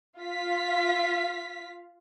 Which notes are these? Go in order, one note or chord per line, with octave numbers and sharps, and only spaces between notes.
F4 F5 B6